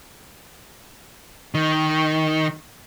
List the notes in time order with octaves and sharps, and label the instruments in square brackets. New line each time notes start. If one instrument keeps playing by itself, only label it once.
[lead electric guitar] D#3